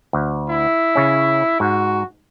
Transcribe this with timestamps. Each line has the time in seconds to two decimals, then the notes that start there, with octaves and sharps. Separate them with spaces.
0.13 D2
0.49 E4
0.95 C#3 C#4
1.60 G#2 F#4